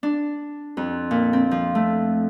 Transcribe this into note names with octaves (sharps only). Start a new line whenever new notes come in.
D4
F2
A#2
C4
F3
A3